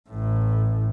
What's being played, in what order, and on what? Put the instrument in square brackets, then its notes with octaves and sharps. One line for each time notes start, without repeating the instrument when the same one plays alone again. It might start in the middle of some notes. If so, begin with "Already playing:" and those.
[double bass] A1 A2